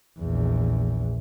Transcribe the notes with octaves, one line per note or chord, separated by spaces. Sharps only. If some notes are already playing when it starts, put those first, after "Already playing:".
A#1 E2